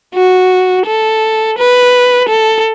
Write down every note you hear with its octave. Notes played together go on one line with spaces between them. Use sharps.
F#4
A4
B4
A4